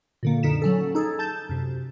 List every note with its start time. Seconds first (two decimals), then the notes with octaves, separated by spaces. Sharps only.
0.23 A#2 D3 A#3
0.43 F#2 D3 D#4 B6 E7
0.62 F#3 C#4 A4
0.95 D#4 G#4 A4
1.19 A5 G6 A6
1.49 F#2 C3